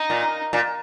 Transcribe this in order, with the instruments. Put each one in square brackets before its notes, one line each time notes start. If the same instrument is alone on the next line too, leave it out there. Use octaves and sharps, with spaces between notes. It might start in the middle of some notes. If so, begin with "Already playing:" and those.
Already playing: [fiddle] D#4
[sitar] A#2
A#2